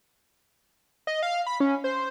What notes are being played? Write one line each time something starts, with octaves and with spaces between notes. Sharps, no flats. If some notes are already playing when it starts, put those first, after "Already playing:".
D#5
F5
B5
C#4
C5